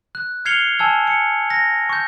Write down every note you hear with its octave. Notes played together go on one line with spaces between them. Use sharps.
F#6
F6 G#6 C7 C#7 F7 G7
G#5 A5 E6 G#6
C#7
A#6
C#6 G6